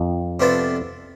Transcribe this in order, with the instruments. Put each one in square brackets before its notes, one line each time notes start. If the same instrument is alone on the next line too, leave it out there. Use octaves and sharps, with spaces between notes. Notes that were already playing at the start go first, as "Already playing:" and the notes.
Already playing: [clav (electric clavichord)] F2
[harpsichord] C3 F3 B3 D4 A4